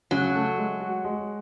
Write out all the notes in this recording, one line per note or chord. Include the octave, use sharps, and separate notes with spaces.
C#3 F#3
A3
G#3
F#4
G#3